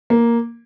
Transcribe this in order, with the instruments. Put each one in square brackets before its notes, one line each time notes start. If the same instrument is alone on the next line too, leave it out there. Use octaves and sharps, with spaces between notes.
[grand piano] A#3